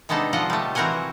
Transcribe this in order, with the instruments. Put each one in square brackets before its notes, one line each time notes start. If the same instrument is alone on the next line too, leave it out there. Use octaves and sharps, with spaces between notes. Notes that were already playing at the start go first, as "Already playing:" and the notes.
[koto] C3 G#3 B3 D4 D#4 A4
F3 F4 D#5 F#5
G3 A3
E3 C4 F#4 A#4 F#5 G#5